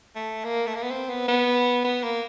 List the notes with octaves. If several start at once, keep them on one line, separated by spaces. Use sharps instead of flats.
A3
A#3
A3
A#3
B3
C4
B3
B3
B3
A#3